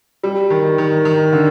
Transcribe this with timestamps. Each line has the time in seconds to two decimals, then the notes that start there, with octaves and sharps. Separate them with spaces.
0.24 G3
0.50 D#3
0.78 D#3
1.05 D#3
1.33 D3